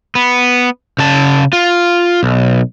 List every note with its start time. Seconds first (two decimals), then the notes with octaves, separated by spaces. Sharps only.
0.15 B3
0.98 C#3 A5
1.53 F4
2.23 B1